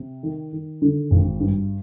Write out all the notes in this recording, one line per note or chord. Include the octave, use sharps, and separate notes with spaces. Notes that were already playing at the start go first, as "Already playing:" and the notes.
Already playing: C3
D#3
D#3
D3
G#1
G2